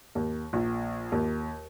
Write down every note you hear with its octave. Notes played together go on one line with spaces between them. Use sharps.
D#2
A#1
D#2